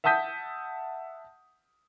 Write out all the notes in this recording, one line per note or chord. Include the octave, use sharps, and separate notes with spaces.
E5 F#5 A5 D#6 G6 B6